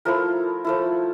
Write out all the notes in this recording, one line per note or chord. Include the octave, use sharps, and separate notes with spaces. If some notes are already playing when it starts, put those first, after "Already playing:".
F3 A3 E4 A#4
F3 A3 E4